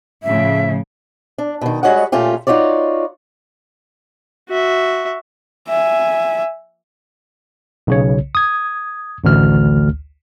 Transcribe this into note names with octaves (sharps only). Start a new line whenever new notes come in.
A2 C#3 F3 E5
D4
B2 D#3
G3 G#3 F#4 C#5 D#5 F#5
A#2 A3 C#4 F4 G4
D#4 F4 F#4 C#5 D5
F#4 E5
E5 G#5
B1 C#3 C#5
D#6 G#6
A1 D2 F6